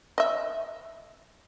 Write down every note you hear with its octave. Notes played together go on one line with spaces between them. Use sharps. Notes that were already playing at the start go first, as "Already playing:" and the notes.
D#5 E5